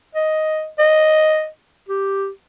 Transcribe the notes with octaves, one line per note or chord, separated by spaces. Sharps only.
D#5
D#5
G4